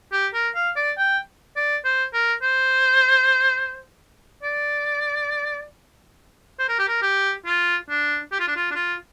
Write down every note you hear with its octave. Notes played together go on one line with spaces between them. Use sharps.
G4
A#4
F5
D5
G5
D5
C5
A#4
C5
D5
C5
A#4
G4
A#4
G4
F4
D4
G4
F4
D4
F4
D4
F4